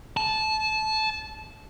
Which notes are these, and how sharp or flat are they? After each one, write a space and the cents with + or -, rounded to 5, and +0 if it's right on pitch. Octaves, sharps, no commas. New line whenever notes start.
A5 -20